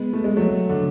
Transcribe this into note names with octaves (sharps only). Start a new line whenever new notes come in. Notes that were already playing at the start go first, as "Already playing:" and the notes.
Already playing: G#3 B3
A3
G#3
F#3 A3
D3